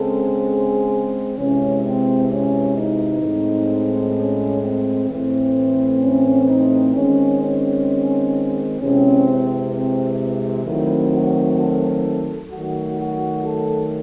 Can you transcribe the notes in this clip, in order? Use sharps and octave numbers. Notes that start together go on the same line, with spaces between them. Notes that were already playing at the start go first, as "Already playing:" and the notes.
Already playing: C#3 G#3 C4 A4
G#4
C3 E3 G#3 C#4
C4
C#4
D#4
A2 G#3 C4
C#4
C4
A2 E3 A3 C4
C#4
D#4
D#3 G#3 C4 C#4
C#4
C3 E3 G#3 C4 C#4
C4
D#3 F#3 A3 C4 E4
F#4
A4
D#3 F#3 A3 F#4
F#4
A4